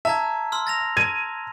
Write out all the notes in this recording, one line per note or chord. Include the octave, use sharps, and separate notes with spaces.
E5 A5 A#5 G#6
C6 E6 F6
A6 A#6 F7
G#6 D#7